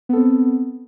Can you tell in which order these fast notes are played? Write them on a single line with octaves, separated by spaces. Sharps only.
B3 A4 C4